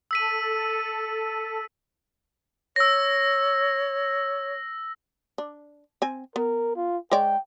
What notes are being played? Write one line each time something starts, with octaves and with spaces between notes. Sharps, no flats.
A4 E6 B6 D#7
C#5 E6 A#6
D4
C4 G#5
B3 A#4
F4
G#3 C#5 D5 G5